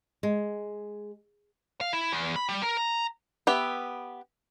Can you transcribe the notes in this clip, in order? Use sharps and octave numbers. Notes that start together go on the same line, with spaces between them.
G#3
F5
E4
E2
B5
G3
A#4
A#5
B3 G4 E5